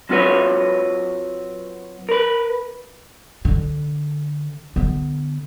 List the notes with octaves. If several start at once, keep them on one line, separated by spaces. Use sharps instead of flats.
F#3 C4 F4 F#4 B4 C#5
A#4 B4
D3
D3 B3